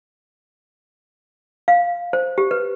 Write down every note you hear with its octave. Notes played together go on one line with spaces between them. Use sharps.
F5
C5
G4
B4